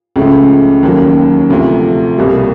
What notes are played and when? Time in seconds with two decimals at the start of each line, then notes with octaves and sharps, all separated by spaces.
0.16 C#2 C#3 F3 A3
0.83 D#2 D#3 F#3 A#3 C#4
1.50 D2 C3 F3 A3
2.18 C2 B2 G3 A#3